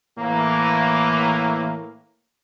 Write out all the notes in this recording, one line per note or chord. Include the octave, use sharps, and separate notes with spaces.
A2 E3 A#3